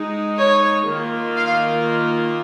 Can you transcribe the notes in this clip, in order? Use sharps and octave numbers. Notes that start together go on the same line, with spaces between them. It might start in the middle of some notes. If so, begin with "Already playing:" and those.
Already playing: G#3 D#4
C#5
D#3 A#3 F4
F5